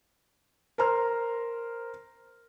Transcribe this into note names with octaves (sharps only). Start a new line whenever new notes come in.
A#4 C5 A#5 C6 F6